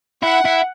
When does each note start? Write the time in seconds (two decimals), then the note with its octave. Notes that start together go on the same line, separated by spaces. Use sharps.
0.23 E4 F#5
0.45 E4